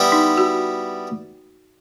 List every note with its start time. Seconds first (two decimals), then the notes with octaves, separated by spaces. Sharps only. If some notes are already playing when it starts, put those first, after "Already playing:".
Already playing: G3 B3 E4 G4
0.12 D#4
0.37 F#4